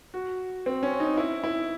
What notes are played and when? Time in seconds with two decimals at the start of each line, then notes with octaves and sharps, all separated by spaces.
0.14 F#4
0.66 C4
0.83 C#4
1.00 D#4
1.17 E4
1.44 E4